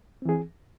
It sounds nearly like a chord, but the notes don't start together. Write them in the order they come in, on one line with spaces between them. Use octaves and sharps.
C4 E3 G#4